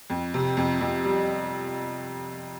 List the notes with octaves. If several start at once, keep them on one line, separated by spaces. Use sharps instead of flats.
F2
C3
F2
F2
G3